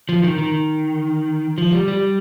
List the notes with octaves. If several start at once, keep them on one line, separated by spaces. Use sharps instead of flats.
F3
D#3
D#3
F3
G3
G3